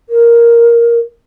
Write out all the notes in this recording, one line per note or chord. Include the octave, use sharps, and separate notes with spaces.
A#4